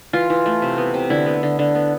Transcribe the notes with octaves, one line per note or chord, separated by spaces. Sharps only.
E3 F4
E3
A3
C3
B3
C3
D3 E4
B3
D3
D3
B3